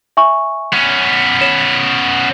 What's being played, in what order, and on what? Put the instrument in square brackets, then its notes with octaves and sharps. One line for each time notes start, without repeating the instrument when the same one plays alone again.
[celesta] E5 G#5 C#6
[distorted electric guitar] B3 C#4
[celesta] C#5 E7